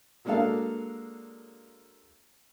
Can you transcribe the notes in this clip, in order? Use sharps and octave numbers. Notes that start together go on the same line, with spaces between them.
F#3 G#3 A#3 D4 A4 F5